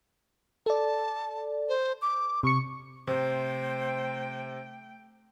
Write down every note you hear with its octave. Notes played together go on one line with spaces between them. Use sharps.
A4 D5 A5
C5
D6
C3 C#6 C#7
C3 A3 C5 G5